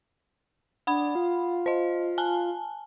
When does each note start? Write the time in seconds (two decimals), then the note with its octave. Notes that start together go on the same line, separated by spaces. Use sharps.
0.87 D4 F#5 B5
1.15 F4
1.66 C5 D#5
2.18 G#5 A5